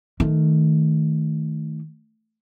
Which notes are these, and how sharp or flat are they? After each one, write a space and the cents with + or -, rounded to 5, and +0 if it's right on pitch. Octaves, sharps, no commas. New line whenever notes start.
D#3 +10 A3 +0